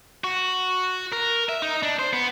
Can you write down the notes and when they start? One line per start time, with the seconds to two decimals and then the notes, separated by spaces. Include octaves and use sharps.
0.24 F#4
1.12 A#4
1.49 E5
1.62 D#4
1.83 D4
1.99 C5
2.13 B3